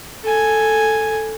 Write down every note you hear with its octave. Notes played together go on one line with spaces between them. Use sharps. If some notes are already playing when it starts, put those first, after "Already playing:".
A4 G#5